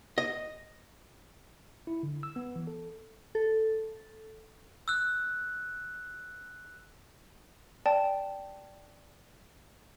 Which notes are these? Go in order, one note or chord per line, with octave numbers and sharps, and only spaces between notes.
D#5
E4
D3
E6
B3
E3
A4
A4
E6 F#6
D5 G5 A5